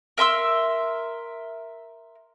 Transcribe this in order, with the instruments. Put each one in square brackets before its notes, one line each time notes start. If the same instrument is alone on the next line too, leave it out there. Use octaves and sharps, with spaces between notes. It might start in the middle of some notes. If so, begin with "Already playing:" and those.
[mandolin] A#4 E5 C6 E6